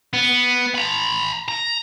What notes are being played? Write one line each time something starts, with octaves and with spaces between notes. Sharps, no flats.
B3
A#5 B5
A#5